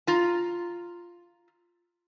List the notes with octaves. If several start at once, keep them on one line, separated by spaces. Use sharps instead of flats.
F4 A#5